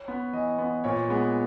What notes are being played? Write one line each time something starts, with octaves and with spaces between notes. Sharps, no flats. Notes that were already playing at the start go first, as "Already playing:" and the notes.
Already playing: C#5
B3
E3 D#5
B3
A#2 C#5
G#3 B3